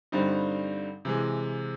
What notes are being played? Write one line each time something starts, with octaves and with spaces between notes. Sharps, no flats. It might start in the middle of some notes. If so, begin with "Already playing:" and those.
G2 D3 G3 C4 D#4
C3 E3 G#3